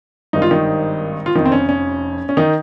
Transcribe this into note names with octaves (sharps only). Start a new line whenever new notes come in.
G#1 G2 D#3 D#4
F4
D#3 D#4
F4
F1 F2 D#3 D#4
C4
C#4
C#4
C#4
D#3 D#4